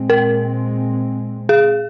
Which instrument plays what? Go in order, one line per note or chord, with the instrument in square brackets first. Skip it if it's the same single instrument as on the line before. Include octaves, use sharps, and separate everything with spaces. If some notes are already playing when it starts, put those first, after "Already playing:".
Already playing: [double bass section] A#2 G#3 C4
[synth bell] A#4
G#4